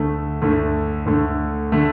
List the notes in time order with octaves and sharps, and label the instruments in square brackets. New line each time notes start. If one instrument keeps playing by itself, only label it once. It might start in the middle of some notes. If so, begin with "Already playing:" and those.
Already playing: [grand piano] D2 D3 A3
D2 D3 A3
D2 D3 A3
D3 A3